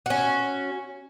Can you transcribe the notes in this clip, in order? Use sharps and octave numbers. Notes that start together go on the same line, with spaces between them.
C#4 F#4